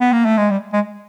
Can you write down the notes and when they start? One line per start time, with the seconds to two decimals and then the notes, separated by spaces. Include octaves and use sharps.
0.00 B3
0.12 A#3
0.25 A3
0.38 G#3
0.50 G3
0.73 G#3